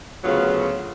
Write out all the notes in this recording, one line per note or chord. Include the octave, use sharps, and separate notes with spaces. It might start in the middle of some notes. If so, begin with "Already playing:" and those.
D2 C#3 F#3 B3 F4